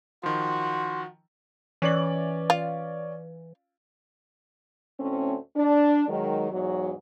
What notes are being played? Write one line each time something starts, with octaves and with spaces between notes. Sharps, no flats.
D#3 F3 F#4 C6
E3 C#4 D5 F#7
F4
D2 A2 A3 C4 C#4
D4
D#3 F#3 G#3
E2 G#2 F#3